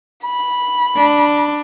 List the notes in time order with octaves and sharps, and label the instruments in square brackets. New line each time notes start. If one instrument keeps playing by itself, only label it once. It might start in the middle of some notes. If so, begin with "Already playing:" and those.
[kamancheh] B5
[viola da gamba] D4